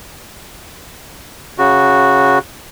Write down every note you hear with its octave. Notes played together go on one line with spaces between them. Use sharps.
C#3 F#4